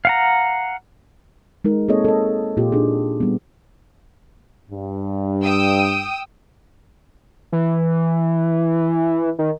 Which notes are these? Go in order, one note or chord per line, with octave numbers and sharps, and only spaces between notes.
F5 F#5 A#5
G#3 D#4 A#4
A#3 C4 G#4 A4 C#5 D#5
A4 D#5
A#2 A#3 F4 G4
D4 D#4 G#4
G3 B3
G2
G5 D#6 E6
E3
D#3